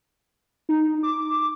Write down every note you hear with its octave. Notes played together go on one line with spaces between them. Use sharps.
D#4
D6